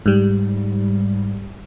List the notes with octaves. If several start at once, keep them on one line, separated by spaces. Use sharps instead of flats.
G#2 G3